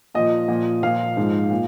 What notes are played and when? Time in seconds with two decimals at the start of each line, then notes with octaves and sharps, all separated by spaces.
0.15 A#2 F3 D#5
0.48 A#2 F3
0.83 A#2 F3 F5
1.17 G#2 F3
1.51 A#2